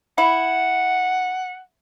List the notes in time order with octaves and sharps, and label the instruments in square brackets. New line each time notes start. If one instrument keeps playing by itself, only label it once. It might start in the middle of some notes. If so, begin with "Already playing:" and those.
[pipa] E4 [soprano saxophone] F#5